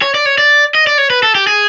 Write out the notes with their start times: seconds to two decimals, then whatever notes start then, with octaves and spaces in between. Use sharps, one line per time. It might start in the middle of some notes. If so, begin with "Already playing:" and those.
0.02 C#5
0.14 D5
0.26 C#5
0.38 D5
0.75 D#5
0.87 D5
0.98 C#5
1.10 B4
1.23 A4
1.35 G4
1.47 G#4